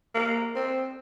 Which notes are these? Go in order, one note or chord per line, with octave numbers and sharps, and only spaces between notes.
A#3
C4